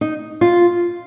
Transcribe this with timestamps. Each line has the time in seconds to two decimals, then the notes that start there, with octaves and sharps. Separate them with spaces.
0.01 D#4
0.41 F4